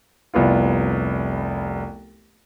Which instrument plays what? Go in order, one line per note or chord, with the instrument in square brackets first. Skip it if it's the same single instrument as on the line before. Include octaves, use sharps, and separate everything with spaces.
[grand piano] F1 C2 B3 F4